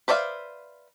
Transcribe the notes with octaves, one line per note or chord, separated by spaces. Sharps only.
B4 C5 D5 E5 F5